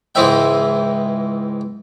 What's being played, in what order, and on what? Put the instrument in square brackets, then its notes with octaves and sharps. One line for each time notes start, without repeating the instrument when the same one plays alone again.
[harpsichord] C#2 G#2 E3 C4 E5 G5